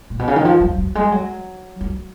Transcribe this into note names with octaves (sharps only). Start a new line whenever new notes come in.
A#2
B2
C#3
D#3
F3
F#3
F#3
G#3
F#3
F#3